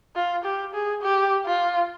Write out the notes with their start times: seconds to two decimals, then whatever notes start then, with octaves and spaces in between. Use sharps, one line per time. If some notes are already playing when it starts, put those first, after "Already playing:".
0.16 F4
0.44 G4
0.74 G#4
1.02 G4
1.46 F4